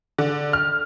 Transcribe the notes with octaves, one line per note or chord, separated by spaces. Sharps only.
D3
F6